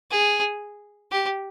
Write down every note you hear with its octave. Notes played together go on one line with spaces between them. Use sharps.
G#4
G4